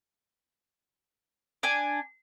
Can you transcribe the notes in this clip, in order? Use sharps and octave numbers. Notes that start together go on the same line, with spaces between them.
D4 G#5